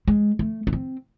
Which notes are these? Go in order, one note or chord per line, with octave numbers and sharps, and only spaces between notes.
G#3
A3
C#4
C4